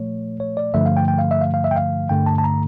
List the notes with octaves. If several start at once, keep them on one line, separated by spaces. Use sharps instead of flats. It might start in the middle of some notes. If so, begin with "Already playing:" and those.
Already playing: A#2 F3 A3 C#5
C#5
D5
G2 D3 F3 A3 E5
F5
G5
G5
F5
E5
F5
F5
E5
G5
F5
G2 D3 A3 G5
A5
A5
A#5